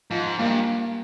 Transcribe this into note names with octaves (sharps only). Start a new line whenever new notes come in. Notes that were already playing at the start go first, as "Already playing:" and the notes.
G#2 F3
G2 A#3